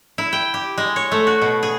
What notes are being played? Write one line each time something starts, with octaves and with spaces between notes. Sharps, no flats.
E4
G5
G4
G#3
C#5
A3
F#4
B2
G#4